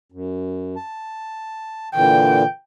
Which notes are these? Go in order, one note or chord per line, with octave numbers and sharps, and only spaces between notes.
F#2
A5
A#2 D3 E3 G5